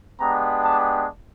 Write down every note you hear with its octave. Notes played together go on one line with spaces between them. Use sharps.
G#3 B3 D4 G4 A#5
A5